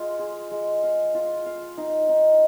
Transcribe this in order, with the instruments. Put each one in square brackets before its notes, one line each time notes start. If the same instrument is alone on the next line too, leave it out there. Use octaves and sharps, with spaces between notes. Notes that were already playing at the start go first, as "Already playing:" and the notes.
Already playing: [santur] G#3 F4
G#4
G#3
F5
F4
F5
D#4
D#4